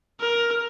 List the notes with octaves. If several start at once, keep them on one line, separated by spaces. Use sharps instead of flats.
A#4